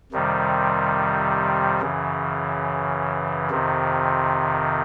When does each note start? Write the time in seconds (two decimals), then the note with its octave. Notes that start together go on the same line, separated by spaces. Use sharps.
0.12 F2 C3 D#3 G3
1.81 F#2 C#3 E3
3.50 F2 C3 D#3